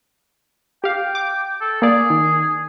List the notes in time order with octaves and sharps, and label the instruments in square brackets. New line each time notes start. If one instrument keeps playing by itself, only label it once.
[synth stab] G4 F5 [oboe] G5
[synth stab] D6
[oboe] A4
[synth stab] A#3 D5 [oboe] G#4
[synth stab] D#3